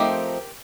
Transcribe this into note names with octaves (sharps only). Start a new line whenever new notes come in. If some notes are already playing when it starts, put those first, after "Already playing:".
Already playing: F3 A3 C4 D#4 G4 A#4